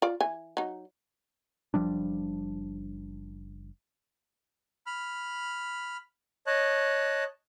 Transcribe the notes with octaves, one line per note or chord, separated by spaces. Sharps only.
F4 D5
E3 G#5
F#3 D#4
F#1 F3 G3 D4
B5 F6
C#5 D#5 A5 F#6